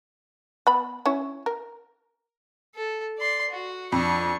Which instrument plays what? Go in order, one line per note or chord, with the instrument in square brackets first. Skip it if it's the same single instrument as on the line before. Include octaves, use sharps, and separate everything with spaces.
[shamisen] B3 B5
C#4 E4 C#5
A#4
[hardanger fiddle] A4
D5 C6
F#4
[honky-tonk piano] F2 [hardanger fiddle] D4 C#6